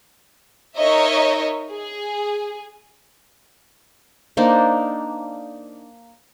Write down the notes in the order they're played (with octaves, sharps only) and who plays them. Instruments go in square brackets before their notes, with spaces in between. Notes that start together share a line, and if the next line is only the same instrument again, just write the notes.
[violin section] D#4 A#4 C#5 D#5 E5
G#4
[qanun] A#3 D4 D#4 C5